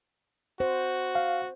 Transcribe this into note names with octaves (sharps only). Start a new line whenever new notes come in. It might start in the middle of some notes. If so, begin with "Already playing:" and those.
F#4 C5
F5